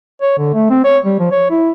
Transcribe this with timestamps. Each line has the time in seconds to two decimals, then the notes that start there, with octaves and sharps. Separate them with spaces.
0.22 C#5
0.38 D3
0.55 A3
0.70 C4
0.85 C#5
1.05 G3
1.20 F3
1.32 C#5
1.51 E4